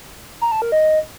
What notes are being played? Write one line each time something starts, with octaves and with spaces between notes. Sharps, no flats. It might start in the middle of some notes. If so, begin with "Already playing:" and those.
A#5
A5
A#4
D#5